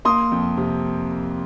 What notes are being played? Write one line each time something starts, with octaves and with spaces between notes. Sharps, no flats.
A#3 C6 D#6
F2
C3